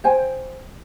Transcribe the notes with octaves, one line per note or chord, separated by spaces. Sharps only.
C5 G5 G#5